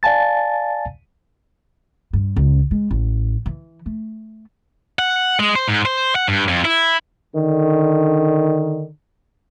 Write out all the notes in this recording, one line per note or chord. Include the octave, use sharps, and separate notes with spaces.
D5 F5 G#5 A5 A6
G2
C#2
G#3
A1
E3
A3
F#5
G#3
C5
G#2
C5
F#5
G2
F2
E4
D3 D#3